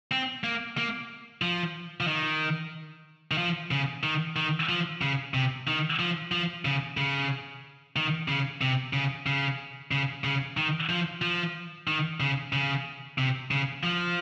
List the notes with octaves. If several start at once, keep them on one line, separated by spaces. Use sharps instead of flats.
C4
A#3
A#3
F3
F3
D#3
D#3
F3
C#3
D#3
D#3
F3
C#3
C3
D#3
F3
F3
C#3
C#3
D#3
C#3
C3
C#3
C#3
C#3
C#3
D#3
F3
F3
D#3
C#3
C#3
C3
C#3
F3